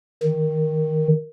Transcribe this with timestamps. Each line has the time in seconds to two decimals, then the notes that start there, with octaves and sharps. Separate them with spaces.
0.23 D#3